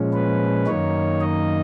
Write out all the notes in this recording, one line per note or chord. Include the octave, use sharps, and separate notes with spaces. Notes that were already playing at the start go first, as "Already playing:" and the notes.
Already playing: A#2 F3 G#3 C#4
B4
F#2 D#3 A#3 D#4 C#5
D#5